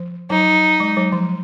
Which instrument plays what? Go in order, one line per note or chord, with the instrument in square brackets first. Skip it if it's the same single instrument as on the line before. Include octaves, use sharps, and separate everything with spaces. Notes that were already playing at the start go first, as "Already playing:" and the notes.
Already playing: [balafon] F3
[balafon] F#3 [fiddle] D#4
[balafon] G#3
F#3
F3